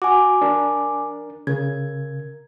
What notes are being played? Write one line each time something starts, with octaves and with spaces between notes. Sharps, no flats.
F#4 G#5 D6
D4 A#4
C#3 A#4 G#6